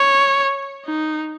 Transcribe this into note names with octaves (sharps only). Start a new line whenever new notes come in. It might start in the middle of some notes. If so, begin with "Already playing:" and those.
Already playing: C#5
D#4